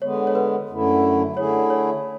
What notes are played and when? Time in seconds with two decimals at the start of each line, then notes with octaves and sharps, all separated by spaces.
0.02 D3 G#3 B3 C#5
0.27 C#5
0.35 B4
0.69 F#2 D3 A3 E4
1.36 D3 A3 E4 G#4 C#5
1.70 C#5